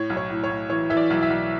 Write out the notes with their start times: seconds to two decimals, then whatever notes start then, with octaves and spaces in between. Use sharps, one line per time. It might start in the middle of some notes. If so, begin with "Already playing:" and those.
Already playing: A2 C#5
0.10 B1
0.17 C#5
0.30 A2
0.44 C#5
0.49 A2
0.69 E3 C#5
0.90 E3 E5
0.97 D5
1.10 B1
1.23 E5
1.30 B1